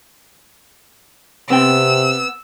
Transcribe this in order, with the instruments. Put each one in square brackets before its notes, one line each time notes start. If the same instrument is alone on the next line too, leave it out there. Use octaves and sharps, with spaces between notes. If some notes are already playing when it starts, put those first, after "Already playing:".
[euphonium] C3 [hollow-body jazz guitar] B3 C4 G5 [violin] E6